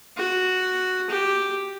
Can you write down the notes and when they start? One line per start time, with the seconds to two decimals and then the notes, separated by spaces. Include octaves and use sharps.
0.17 F#4
1.10 G4